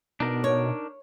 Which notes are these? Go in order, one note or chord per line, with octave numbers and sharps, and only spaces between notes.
B2 D4 D#4 A#4
C#5